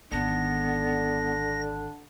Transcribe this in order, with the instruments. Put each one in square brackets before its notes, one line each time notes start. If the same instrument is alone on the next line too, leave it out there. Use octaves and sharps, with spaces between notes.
[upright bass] G#1 D#3 [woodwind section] D3 D4 [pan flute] B3 [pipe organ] A#6